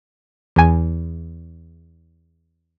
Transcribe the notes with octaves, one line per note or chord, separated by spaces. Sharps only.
E2 G#5